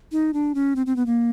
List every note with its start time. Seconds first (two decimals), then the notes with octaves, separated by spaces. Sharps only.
0.12 D#4
0.34 D4
0.55 C#4
0.76 C4
0.86 C4
0.96 B3
1.06 A#3